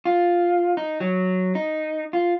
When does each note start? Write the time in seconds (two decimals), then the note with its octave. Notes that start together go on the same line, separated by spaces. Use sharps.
0.05 F4
0.77 D#4
1.00 F#3
1.55 D#4
2.13 F4